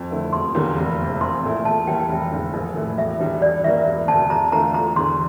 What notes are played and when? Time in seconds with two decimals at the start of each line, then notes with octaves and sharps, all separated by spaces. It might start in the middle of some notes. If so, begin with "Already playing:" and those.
Already playing: F2
0.11 D3 A3 E4
0.33 E1 C6
0.55 E2 D3 G3 A#3
0.77 F1
1.00 E2 C3
1.21 A#1 C6
1.43 A#2 A3 E4
1.65 E2 A5
1.87 E3 G3 A#3 E4 G5
2.09 F1
2.31 E2 D3
2.54 A#1
2.76 A2 E3 A3
2.98 E1 E5
3.20 E2 E3 G3 D4
3.42 G2 D5
3.64 E3 G3 A#3 E5
3.85 E1
4.08 D2 C3 A5
4.30 E2 A#5
4.52 D3 A3 D4 F4 A#5
4.74 E1 A#5
4.96 E2 D3 C6